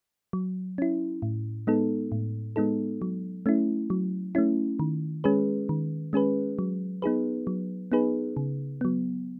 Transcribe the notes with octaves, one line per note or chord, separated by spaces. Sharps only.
F#3
C#4 E4
A2
G#3 B3 D#4 A4
A2
G#3 B3 D#4 A4
F#3
A3 C#4 E4
F#3
A3 C#4 E4
D#3
G#3 C#4 G#4 B4
D#3
G#3 C#4 G#4 B4
F#3
B3 D#4 G#4 B4
F#3
B3 D#4 G#4 B4
C#3
F#3 B3